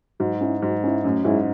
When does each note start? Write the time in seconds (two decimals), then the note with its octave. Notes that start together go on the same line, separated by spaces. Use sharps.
0.20 G#2 F#3
0.41 C#4 E4
0.62 G#2 F#3
0.84 C#4 E4
1.04 F#2 A2
1.25 G#2 G#3 C#4 E4